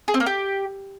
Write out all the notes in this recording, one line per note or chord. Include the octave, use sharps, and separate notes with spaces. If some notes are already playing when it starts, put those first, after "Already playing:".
G#4
C4
A#3
G4